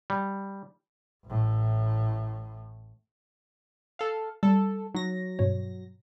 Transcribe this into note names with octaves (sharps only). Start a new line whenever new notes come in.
G3
A1 A2
A4 F5
G3 A4
F#3 D#4 A#6
G2 B2 C#5